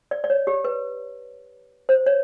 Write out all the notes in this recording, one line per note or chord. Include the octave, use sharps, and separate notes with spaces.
D5
D5
C#5
G4
B4
C5
C#5